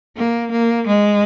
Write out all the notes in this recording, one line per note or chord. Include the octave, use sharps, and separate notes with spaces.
A#3
A#3
G#3